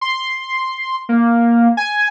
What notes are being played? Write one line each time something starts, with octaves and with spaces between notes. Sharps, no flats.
C6
A#3
G#5